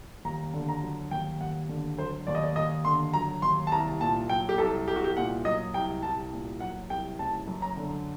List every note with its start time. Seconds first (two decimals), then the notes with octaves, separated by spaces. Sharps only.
0.25 D#2 A#5
0.53 D3
0.69 A#5
0.82 F#3
1.11 D#2 G5
1.41 D#2 F#5
1.69 D3
1.98 F#3 C5
2.27 D#2 D5
2.35 D#5
2.43 D5
2.56 D#2 D#5
2.85 D3 C6
3.13 F#3 A#5
3.42 D#2 C6
3.67 A5
3.72 C2 A#5
4.01 A#2 A5
4.29 F#3 G5
4.49 G4
4.58 C2 A4
4.88 C2 G4
4.96 F#4
5.04 G4
5.17 A#2 F#5
5.45 F#3 D#5
5.74 C2 G5
6.03 C2 A5
6.32 A#2
6.60 F#3 F#5
6.90 C2 G5
7.19 F#1 A5
7.47 F#2
7.62 A#5
7.77 D3